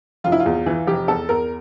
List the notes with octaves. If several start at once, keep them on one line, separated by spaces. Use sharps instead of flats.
F1 F4
E4
F4
E2
E3
F1 G4
E2 A4
E2 A#4